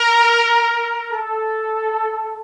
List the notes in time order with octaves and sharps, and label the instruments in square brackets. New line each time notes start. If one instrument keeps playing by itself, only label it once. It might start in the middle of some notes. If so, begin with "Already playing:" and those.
Already playing: [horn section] A#4
A4